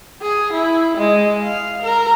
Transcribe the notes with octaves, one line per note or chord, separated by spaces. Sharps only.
G#4
E4
G#3
F5
A#4